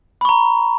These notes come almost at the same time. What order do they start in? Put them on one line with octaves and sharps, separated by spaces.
B5 C#6 A#5